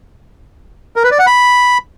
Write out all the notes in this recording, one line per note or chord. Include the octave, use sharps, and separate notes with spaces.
A#4
B4
D5
F#5
B5